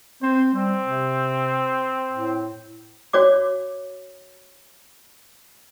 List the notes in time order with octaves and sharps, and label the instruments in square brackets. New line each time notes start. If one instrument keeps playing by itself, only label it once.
[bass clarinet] C4 [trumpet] C5
[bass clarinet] G3 [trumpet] C4
[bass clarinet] C3
A2
[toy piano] F#4 C#5 D5 D6